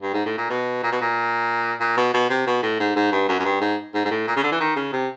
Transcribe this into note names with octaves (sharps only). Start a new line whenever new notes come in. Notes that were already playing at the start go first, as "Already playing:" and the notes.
G2
G#2
A2
A#2
B2
A#2
B2
A#2
A#2
B2
B2
C3
B2
A2
G#2
G#2
G2
F#2
F#2
G2
G#2
G#2
G#2
A2
A#2
C#3
D3
E3
D#3
C#3
C3